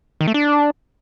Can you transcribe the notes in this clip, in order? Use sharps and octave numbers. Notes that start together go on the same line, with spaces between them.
D#3
A3
D4